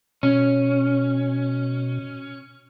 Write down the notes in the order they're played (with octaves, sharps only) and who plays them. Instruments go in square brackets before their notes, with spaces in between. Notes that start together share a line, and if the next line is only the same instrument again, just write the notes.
[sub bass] B2 [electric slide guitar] C#4